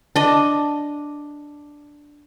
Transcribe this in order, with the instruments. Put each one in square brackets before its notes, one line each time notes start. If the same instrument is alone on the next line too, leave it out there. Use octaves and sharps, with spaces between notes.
[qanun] D4 D#5